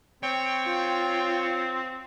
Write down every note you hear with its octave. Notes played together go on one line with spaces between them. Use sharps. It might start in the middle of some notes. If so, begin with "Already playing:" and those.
C4 C#5 G5
F4